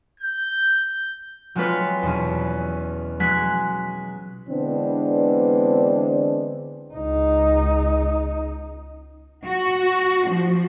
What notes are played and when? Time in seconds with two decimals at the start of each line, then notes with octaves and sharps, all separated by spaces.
0.20 G6
1.55 F#3 G#3 C4 F4 B4 C#5
2.03 E2 B2 C#4
3.20 F#3 G#3 F#6 G#6 B6
4.49 D3 E3 G#3 B3 C4 D4
6.94 C#2 D#4
9.45 F#4
10.30 F3